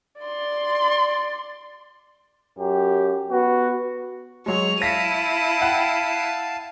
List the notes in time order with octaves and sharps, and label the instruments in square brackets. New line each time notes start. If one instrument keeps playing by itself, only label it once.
[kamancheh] D5 C6
[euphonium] F#2 [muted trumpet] G4
[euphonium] B3 [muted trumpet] F#4
[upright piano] F#3 G#3 [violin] C#5 F7
[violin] E4 D#7 [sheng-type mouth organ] F5 A5 [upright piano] A#6 B6 C#7
[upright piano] F#5 G5